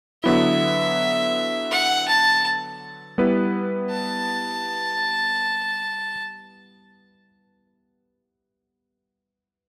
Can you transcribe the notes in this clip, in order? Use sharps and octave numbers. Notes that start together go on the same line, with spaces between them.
D3 F#3 B3 E4 E5
F#5
A5
G3 B3 E4 B4
A5